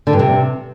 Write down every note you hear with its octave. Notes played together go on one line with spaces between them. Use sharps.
D3
G2
C3